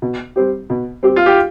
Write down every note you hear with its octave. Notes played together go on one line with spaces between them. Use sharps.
B2
G3 C4 G4
B2
G3 C4 G4
F4
G4